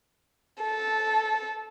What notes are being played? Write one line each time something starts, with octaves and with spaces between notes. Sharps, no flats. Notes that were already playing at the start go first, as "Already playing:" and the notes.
A4